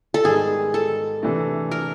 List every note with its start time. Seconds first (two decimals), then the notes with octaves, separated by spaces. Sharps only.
0.14 A4
0.24 G#2 D#3 G3 B3 D#4 G#4
0.74 A4
1.22 C3 E3 A3 D4
1.71 A#4